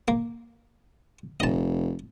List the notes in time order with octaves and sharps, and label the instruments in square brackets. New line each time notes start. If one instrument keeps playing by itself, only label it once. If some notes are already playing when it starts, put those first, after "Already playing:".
[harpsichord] A#3
[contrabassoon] F1 [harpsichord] D#5 A5